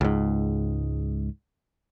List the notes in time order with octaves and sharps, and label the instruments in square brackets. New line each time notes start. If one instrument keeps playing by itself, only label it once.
[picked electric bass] C#2 G#2